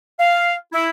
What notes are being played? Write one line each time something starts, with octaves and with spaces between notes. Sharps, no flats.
F5
E4